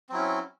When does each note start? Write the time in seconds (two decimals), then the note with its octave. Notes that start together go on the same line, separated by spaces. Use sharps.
0.09 C4
0.12 F#3
0.14 E4
0.17 C#4